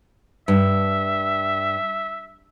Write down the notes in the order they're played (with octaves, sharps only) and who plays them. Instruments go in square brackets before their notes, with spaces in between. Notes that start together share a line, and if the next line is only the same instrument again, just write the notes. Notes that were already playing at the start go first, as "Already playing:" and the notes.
[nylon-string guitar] G2 [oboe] E5